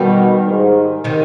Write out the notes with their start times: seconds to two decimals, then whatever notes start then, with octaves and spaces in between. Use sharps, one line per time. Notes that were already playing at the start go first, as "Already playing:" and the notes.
Already playing: B2 D#3 G3
0.47 G#2
1.04 C3 D#3